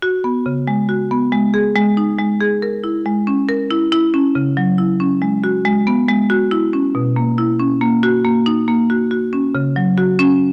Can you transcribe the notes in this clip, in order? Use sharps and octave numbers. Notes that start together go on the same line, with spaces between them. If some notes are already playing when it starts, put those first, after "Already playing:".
F#4
B3
C#3
G#3
F#4
B3
G#3
G#4
G#3
D#4
G#3
G#4
A#4
E4
G#3
C#4
A#4
E4
E4
C#4
C#3
F#3
E4
C#4
G#3
F#4
G#3
B3
G#3
F#4
E4
C#4
B2
A#3
E4
C#4
A#3
F#4
A#3
D#4
A#3
F#4
F#4
C#4
C#3
F#3
F#4
C#4